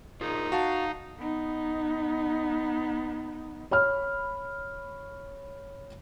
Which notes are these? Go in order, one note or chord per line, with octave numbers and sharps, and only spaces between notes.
D#4 F4 G#4 A#4
F#4 F5 A5
B3 D#4
C#5 B5 F6